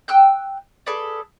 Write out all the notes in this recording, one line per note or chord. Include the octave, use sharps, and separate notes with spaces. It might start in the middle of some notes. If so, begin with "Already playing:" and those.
G5 E6 F#6 G6
G#4 A4 B4 D5